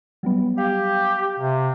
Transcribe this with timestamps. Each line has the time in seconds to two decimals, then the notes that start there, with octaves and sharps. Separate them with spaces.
0.23 F#3 G3 B3
0.58 G4 F5
1.39 C3